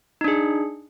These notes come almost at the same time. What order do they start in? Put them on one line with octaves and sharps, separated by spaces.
D#4 D4 G#4